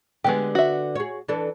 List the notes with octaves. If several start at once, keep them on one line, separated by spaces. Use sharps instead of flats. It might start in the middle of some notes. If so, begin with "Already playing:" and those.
D3 G#3 B3 G4
F#4 E5
G#4 C#5
E3 D4 A4